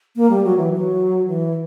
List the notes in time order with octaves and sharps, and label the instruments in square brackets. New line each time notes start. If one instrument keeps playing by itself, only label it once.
[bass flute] A#3
G3
F#3
E3
F#3
E3